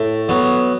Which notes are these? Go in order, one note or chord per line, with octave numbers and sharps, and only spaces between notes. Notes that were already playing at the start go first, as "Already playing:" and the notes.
Already playing: A2
F#3 B3